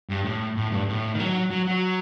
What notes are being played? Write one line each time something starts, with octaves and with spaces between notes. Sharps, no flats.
G2
A2
A2
G2
A2
D#3
F#3
F#3
F#3